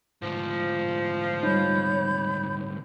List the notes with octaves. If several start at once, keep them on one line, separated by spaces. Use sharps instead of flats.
D2 G#2 F3
G3 D#4 C#5 B5 G6